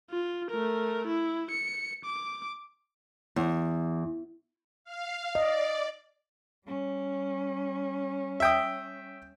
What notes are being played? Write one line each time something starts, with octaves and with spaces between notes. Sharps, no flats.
F4
A3 A#4
E4
C#7
D6
E2
F5
D5 D#5
G3 C#4
E5 G5 D#6